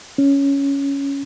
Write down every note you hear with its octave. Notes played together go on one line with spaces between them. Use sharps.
C#4